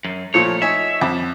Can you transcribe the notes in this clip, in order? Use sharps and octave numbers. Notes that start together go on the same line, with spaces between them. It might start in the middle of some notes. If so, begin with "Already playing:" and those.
F#2
A#2 F3 A3 C#5
D#4 C#5 E5 G#5
F2 D6